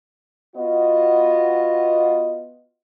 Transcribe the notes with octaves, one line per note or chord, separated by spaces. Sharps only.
B3 F4 F#4 D#5